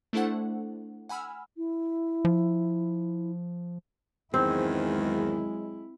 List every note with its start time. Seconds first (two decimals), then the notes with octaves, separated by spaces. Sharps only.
0.13 A3 D4 E4 A4 C5 F#5
1.09 F#5 G#5 B5 E6 F6
1.57 E4
2.25 F3
4.34 E2 G#2 D#3 F#3 G#3 C4 E4